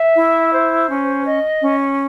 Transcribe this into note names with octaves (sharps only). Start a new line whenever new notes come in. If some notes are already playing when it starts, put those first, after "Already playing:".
Already playing: E5
E4
C5
C#4
D#5
C#4